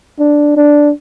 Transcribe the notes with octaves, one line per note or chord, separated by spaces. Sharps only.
D4
D4